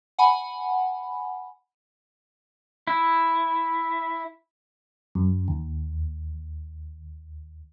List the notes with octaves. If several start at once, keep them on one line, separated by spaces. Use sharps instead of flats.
F#5 G#5 B5
E4
F#2
D#2